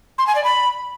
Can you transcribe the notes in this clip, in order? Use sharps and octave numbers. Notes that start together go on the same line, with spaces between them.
C6
G#5
D5
B5